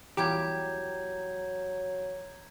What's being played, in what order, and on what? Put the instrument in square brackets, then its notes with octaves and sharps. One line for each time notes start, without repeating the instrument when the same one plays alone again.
[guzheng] E2 G3 F4 [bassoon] F#3 [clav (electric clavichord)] G4 [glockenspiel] A#5 G6 G#6